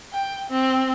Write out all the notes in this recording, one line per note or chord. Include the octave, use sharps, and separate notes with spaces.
G5
C4